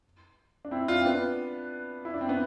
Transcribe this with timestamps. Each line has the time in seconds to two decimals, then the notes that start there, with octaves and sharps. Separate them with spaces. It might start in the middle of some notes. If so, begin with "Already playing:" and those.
0.65 D4
0.71 C4 E4
0.88 D4 F4
1.01 C4
1.05 B3 D4
2.05 E4
2.14 D4
2.21 C4
2.29 B3 D4